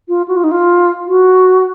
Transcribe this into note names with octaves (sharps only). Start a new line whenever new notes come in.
F4
F#4
F4
D#4
F4
F#4